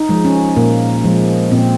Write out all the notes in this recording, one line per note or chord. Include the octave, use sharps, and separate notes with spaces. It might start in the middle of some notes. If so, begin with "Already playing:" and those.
Already playing: D#4
F3 G#3
C#4
A#2 A#3
F3 G#3
A#2 C4